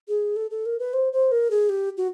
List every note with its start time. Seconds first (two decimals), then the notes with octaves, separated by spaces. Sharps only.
0.08 G#4
0.36 A4
0.51 A4
0.66 A#4
0.79 B4
0.93 C5
1.13 C5
1.32 A#4
1.51 G#4
1.69 G4
1.97 F#4